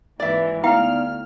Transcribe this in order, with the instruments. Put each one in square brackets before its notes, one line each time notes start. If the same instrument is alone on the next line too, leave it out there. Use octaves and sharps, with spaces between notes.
[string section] G#1 D#2 E3 [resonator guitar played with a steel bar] D5 E5
[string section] D2 F6 [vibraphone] B3 D#4 D5 [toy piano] E4 G5 [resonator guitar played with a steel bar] F5